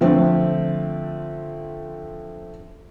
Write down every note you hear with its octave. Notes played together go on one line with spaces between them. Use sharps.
D3 F3 A3 C4